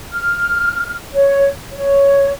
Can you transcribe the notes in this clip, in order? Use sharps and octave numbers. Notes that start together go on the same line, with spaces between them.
F6
C#5
C#5